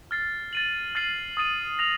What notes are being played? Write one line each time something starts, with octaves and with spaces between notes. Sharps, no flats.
F6 A6 C7
A6 D#7 F#7
F6 A6 C7 D#7 F#7
D#6 A6 D#7 F#7
F6 A#6 F7